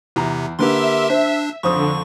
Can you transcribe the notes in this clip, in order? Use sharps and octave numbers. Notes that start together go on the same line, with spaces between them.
E2 C3 A#5
D3 A#3 G4 A#4 B4 E5 C6
D4 C5
F2 D3 C5 C#6 D#6